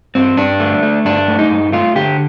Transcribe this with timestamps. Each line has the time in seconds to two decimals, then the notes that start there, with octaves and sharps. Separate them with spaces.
0.15 G2 C4
0.37 G2 D4
0.60 A3
0.83 A3
1.05 G2 D4
1.28 A3
1.39 D#4
1.51 G2
1.73 A3 F4
1.96 D3 G4